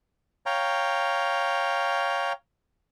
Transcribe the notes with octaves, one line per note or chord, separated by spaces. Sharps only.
C#5 F5 G5 A#5